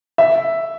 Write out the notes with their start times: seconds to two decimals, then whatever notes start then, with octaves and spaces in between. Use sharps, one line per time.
0.18 E5